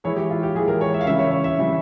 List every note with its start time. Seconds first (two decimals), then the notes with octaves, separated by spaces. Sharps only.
0.04 E3 G#3 E4 C#5
0.16 G4
0.30 F4
0.43 G4
0.55 E3 G#3 E4 G#4
0.68 A#4
0.81 C#5
0.94 E5
1.01 F5
1.06 C#3 E3 G3 E5
1.19 C#5
1.31 C#5
1.44 E5
1.57 C#3 E3 G3